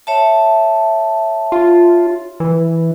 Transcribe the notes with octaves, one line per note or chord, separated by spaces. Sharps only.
C#5 E5 A5
F4
E3